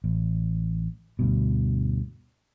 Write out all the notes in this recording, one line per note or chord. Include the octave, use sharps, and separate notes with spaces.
A1
D2 G2 B2